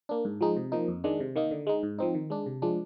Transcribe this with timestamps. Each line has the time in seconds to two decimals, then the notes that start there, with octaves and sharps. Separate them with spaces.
0.09 A#3 D4
0.25 G#2
0.41 F3 G#3 D#4
0.57 C3
0.72 F3 A#3 D#4
0.88 F2
1.04 D#3 G#3 D4
1.20 C3
1.36 D#3 A#3 D#4
1.51 D3
1.67 G#3 D#4
1.83 G#2
1.99 F3 C4 D#4
2.15 D#3
2.30 G#3 D4
2.46 C3
2.62 F3 G#3 D4